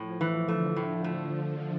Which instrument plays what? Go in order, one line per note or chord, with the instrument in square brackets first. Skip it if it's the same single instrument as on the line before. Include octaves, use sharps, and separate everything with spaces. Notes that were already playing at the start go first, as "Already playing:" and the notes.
Already playing: [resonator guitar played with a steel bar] A2 [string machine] F3
[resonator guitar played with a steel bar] E3
[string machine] D3 [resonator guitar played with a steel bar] A3
[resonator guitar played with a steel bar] A2
A3